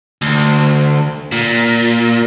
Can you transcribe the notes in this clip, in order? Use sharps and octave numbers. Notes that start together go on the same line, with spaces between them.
D2
A#2